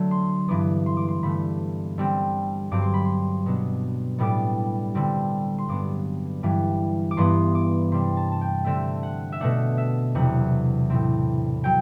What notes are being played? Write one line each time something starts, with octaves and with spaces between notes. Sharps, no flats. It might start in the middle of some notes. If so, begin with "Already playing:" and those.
Already playing: D3 F#3 A3
C6
G2 E3 B3 D6
C6
D6
C6
G2 D3 A3 B5
D3 G3 C4
G2 F#3 C4 D6
C6
B5
C6
B2 F#3 B3 D4
A2 G3 B3 D4 D6
D3 G3 C4
C6
G2 F#3 B3 D4 D6
G2 E3 G3
D6
G2 E3 B3 C6
D6
C3 G3 D4 C6
A5
A5
G5
D3 A3 C4 E5
F#5
E5
B2 A3 D4 F#5
E5
E2 C3 F#3 A3 D4 F#5
A2 E3 A3 C4
F#3 G5